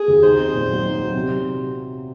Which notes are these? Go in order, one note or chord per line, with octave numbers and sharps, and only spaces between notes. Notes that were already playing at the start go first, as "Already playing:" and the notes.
Already playing: G#4
D#2
D#4 C5
C4
A#2
F#3
D#4
F#3
C3